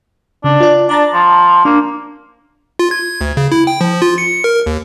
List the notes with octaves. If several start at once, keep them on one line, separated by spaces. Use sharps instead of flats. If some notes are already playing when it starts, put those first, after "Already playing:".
C#3 D4
F4 D5
D4 A5 A#5 A6
F3
A#3 D4
F4
G#6
D2
C#3
E4
G5
F3
F4
C#7
A#4
D#2